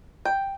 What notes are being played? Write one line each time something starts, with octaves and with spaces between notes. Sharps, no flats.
G5